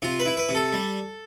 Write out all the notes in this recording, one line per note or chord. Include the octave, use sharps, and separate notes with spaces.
C3 F4
B4
E4
B4
C3
A4
G3